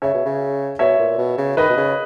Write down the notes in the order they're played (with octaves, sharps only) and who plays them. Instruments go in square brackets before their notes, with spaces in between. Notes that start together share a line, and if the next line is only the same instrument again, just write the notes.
[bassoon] C#3 [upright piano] C#5 E5
[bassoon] B2
C#3
[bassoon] B2 [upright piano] C#5 E5
[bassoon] A#2
B2
C#3
[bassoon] D#3 [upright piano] B4 D#5
[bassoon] B2
C#3